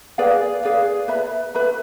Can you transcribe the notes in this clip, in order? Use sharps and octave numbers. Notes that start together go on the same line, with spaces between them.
G#4 B4 D5 F5
G#4 B4 D5 F5
B4 E5 B5
B4 E5 B5